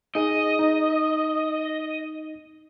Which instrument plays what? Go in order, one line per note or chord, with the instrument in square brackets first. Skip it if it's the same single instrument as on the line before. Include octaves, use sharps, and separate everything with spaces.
[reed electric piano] D#4 G#4 [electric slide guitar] D#5
[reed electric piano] D#4